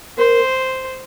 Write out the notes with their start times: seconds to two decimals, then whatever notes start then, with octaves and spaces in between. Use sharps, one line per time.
0.18 A#4 C5